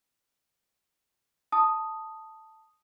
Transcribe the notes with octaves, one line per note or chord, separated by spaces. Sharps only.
A5 D#6